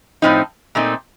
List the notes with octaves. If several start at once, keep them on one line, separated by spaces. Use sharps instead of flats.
A2 F3 C4 D#4
A#2 A3 C4 D#4